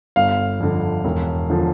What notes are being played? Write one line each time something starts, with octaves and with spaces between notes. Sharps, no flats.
G1 F5
F2 D3
E1
D3 F3